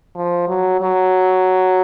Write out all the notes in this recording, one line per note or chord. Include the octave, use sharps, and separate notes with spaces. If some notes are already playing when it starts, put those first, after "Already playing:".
F3
F#3
F#3